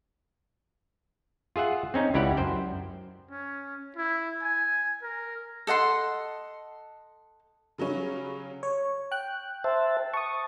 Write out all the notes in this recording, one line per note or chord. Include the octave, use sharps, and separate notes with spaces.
F4 G#4 E5 F#5
C4 C#4 D#4
C#2 E4 G4 D5 F#5
F#2 C5 G5
C#4
E4
G#5
A#4
A4 D#5 F#5 C6
C#3 F#3 G3 C#4
C#5
G5 F#6
C5 E5 A5
A5 C#6 D#6